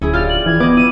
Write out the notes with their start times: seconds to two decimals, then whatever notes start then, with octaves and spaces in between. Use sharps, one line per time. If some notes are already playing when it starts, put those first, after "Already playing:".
0.02 D1 C#4 E4 G#4
0.13 F4 G4 D5 F6
0.29 F#7
0.46 E3 G#6
0.60 B3 D#5 D6
0.77 E4 D#7